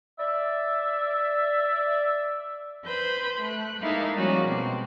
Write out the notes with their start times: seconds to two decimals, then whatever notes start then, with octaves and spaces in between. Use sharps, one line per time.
0.19 D5 E5
2.85 B4 C5 B5 G6
3.42 A3 F#6
3.82 G#3 A#3 D#4 E4 A4 F5
4.16 F3 G3 G#3 A#3 C#4 F#4
4.46 B2 C4